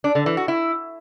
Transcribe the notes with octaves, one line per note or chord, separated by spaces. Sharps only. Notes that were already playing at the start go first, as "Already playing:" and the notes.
D4
D3
E3
F#4
E4